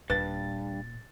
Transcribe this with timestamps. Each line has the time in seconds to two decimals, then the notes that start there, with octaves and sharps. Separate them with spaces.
0.10 D#1 G2 A#2 B4 A6